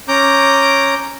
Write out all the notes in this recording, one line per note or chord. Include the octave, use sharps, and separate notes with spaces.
C#4 A#5 D6 G6